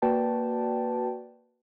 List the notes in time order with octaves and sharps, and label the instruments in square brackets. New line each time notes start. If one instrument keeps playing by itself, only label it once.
[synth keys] A#3 F#4 B4 D5 G5 A5